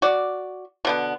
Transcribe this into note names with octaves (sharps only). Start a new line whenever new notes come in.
F#4 D5
B2 D3 B3